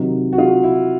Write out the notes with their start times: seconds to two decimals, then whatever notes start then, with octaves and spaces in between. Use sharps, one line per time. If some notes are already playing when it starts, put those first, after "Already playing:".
Already playing: C3 D#3 F#3
0.33 F#4
0.38 F4
0.63 E4